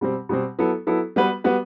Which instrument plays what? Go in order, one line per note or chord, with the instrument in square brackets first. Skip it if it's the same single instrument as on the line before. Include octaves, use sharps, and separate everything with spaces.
[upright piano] B2 G3 C4
B2 G3 C4
F#3 B3 E4 A4
F#3 B3 E4 A4
G3 B3 F#4 B4
G3 B3 F#4 B4